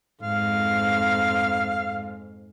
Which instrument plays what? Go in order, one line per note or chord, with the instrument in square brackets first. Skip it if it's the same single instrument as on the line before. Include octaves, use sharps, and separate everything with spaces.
[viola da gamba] F2 G#2 [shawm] F5